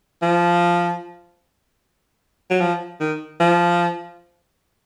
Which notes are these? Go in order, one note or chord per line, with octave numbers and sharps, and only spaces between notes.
F3
F#3
F3
D#3
F3